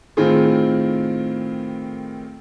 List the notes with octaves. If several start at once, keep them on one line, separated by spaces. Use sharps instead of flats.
A2 D#3 C4 F4 G#4